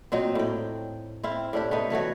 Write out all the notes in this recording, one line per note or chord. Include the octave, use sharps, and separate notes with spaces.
A#2 F#3 C4 D#4
A2 G5
C4 E4 F5
A2 D4 G4
A3 B3 D#4
E3 A3 F#4 C#5